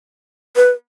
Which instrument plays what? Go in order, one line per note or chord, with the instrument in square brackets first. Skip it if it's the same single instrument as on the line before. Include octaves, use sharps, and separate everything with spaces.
[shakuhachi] B4